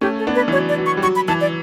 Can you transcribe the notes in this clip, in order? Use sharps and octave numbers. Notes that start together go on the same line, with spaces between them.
A3 C#4 G4
A4
B3 D4
B4
E3
F#3 C#5
D5
F#3
C#6
G3
F#3 C#6
B5
E3 A5
D5